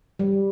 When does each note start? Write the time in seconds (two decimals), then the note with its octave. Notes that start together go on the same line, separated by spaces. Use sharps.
0.19 G3